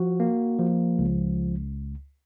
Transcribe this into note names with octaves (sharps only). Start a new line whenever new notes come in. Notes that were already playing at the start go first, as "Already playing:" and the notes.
Already playing: F3 F#4
A#3
F3
C#2